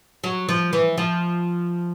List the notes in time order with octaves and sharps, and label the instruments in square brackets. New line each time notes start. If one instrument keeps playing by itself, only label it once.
[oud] F#3
F3
E3
F3